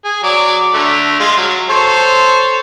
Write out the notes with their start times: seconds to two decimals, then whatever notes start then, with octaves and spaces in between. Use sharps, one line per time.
0.04 G#4
0.23 F#3 D5
0.74 D3 A3
1.20 G#3 F4
1.37 F#3
1.69 A4 C5 C#5